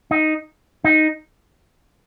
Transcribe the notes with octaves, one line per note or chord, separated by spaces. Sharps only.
D#4
D#4